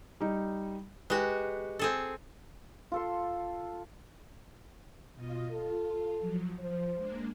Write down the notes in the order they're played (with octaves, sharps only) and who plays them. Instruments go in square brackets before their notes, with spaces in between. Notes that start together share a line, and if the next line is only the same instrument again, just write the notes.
[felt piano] G3 D#4
[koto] G#3 F#4 [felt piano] G4 B4
[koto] C4 G#4 A4
[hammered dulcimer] F4 A4 C6
[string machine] B2 F4 D#5
[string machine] F4 [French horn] A4
[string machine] F3 F#3
[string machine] F3 [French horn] C5
[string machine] G#3 A#3 D4